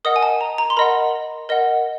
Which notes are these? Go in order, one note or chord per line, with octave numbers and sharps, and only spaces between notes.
A#4 D#5 F#5 D#6
G#5
A5
A#5
A#5
C6
A#4 D#5 F#5 B5
A#4 D#5 F#5